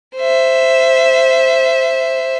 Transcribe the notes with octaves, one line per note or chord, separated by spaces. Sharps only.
C5 E5